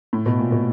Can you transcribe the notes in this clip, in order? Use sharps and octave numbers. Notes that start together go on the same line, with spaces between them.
A2
B2
A#2
B2